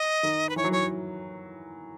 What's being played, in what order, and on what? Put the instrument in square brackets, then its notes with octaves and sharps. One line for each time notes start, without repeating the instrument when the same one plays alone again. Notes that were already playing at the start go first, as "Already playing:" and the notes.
Already playing: [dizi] D#5
[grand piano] D#3
[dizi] B4
[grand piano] E3 [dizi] C#5
[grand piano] F#3
[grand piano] E3 [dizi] C#5